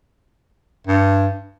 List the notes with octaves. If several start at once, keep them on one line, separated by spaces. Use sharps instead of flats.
G2